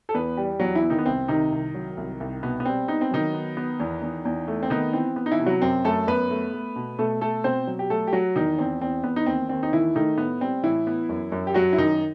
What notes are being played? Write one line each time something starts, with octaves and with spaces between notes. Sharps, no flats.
A4
E2 B3 B4
G3 G4
E2 F#3 F#4
E3 E4
B3
D#3 D#4
B3
C2 C4
C3 D#3 D#4
C2
F#3
C2
C2
B2 B3
B3
G3 C4
B3 D#4
C4
D#3 F#3 D#4
B3
B3
E2
E2
E2
A3
C4
D#3 B3 D#4
E3 C4
B3
D#4
E3 E4
C3
F#3 F#4
F#2 C4
F#2 A3 A4
F#2 B3 B4
A3
A3
B2
B2 A3 A4
A3 A4
B2 C4 C5
F#3
G4
F#3 A3 A4
G4
F#3 F#4
E2 D#3 D#4
E2 C4
E2 C4
E2 B3
D#4
D#2 C4
D#2 C4
D#4
D#3 E3 E4
D#3 A3 D#4
A2 B3
G3 C4
A2 E3 E4
B3
F#2
F#2
G4
F#2 F#3 F#4
E4
F#2 D#3 D#4